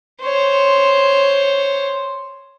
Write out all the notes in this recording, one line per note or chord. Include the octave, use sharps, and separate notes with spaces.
C5 C#5